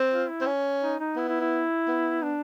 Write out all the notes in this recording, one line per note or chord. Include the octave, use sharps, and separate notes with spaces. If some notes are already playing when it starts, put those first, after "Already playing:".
Already playing: C4
F4
E4
C4
C#4
D#4
D#4
B3 E4
E4
E4
B3
D4